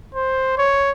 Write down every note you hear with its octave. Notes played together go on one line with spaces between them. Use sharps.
C5
C#5